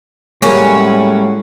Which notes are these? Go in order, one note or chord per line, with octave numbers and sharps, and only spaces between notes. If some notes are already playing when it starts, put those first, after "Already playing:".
A2 G3 G#3 A#3 C#4 F#4 G#4 C#6